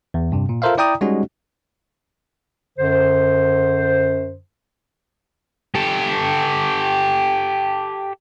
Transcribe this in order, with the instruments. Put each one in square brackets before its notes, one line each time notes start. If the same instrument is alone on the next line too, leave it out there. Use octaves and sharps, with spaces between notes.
[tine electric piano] E2
G2 C3
A#2
F4 A4 A#4 C5 E5 F5
E4 D5 G5 A#5 D#6
G3 G#3 C#4 D#4 F#4
[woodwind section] F#2 D3 C5
[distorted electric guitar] G4 A4